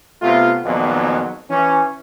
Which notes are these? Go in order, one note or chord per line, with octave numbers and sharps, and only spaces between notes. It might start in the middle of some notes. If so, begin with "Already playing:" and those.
C3 A3 B3 F4
F2 A#2 D#3 F#3 G#3 B3
E3 C#4